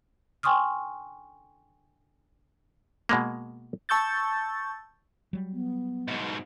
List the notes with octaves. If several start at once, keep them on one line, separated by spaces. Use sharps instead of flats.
G5 G#5 C6 C#6 D#6 F6
B2 G#3 A#3
A5 C#6 E6 G6 A6
F#3 G3
B3
G#2 B2